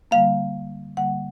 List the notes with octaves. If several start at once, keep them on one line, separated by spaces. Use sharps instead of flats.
D3 G3 A#3 F5
D3 G3 A#3 F#5